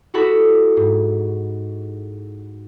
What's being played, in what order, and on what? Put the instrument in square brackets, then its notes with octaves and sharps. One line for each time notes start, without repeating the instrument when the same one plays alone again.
[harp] E4 F#4 G4 A4 B5
G#2